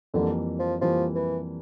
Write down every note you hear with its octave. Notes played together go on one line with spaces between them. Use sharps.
F2 D3 E3 G3 A#3
F3
F2 E3 F3 G3 A#3
E3